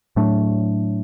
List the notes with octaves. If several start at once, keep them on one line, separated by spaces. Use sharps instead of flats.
A2 F#3 A3 D4